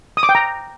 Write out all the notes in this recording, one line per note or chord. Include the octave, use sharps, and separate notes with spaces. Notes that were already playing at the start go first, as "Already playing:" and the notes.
D#6
D6
G5
A#5